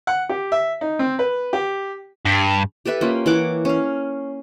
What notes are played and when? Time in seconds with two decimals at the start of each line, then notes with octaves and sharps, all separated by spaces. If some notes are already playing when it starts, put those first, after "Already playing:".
0.07 F#5
0.29 G4
0.52 E5
0.81 D#4
0.99 C4
1.19 B4
1.53 G4
2.25 G2
2.86 G4 A4 B4 E5
3.01 A#3 C#4 F4
3.26 E3 C#5 F#5 D6
3.65 C#4 F5